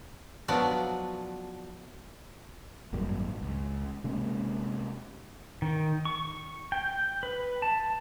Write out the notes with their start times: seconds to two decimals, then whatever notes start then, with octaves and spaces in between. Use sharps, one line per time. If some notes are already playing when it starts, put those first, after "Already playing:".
0.48 F3 F#3 B3 D4 F#4 D5
2.93 G#1 F#2 A#2 G3
3.42 C#2
4.04 C3 G#3 A#3 C#4
5.62 D#3
6.05 C#6
6.72 G5
7.23 B4
7.62 A5